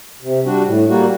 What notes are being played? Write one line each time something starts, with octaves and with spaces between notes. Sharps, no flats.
C3
G3 D4 F#4
A2
G3 A#3 F#4